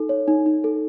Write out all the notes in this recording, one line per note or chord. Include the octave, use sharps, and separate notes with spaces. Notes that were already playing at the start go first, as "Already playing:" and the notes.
Already playing: D#4 A4
C#5
D#4
D#4
A4